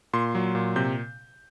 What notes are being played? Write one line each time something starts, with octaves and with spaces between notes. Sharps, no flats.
A#2 C6
F#3
A#2
C3 G6